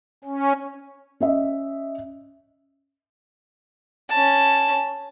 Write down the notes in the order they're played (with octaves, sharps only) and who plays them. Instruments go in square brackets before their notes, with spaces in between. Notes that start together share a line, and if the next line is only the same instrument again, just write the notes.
[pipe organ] C#4
[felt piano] C#4 D#5 E5
[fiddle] C#4 A5